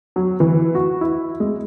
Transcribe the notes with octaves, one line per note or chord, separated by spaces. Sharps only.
F#3
E3
F#4
E4
G#3